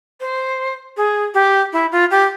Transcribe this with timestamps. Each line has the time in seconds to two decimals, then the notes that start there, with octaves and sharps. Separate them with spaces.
0.21 C5
0.97 G#4
1.34 G4
1.73 E4
1.92 F4
2.11 G4